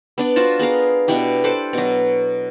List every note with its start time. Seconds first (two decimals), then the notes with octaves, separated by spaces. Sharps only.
0.18 B3 D4 D5
0.36 F4 F#4 C5 A5
0.59 B3 G#4 A#4 F5
1.08 B2 D4 E4 G4
1.44 A4 B4 C5 D6
1.73 B2 F#3